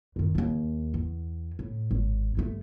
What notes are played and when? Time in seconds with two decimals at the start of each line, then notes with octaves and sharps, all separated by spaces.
0.16 F#2 D#3
0.35 D#2 A#3
0.94 E2
1.59 A2
1.91 G#1
2.37 G1 A3